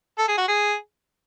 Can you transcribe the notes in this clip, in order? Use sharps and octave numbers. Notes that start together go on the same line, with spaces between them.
A4
G#4
F#4
G#4